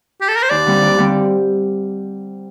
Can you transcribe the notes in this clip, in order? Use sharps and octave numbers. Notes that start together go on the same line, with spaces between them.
G4
A4
A#4
C5
D#2 D5
D3 G3 C4
D#2
D3 G3 C4